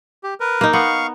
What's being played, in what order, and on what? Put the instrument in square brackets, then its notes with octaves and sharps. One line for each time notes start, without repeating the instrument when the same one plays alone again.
[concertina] G4
A#4 B4
[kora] A#3 D#4
[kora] B3 [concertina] F5 C#6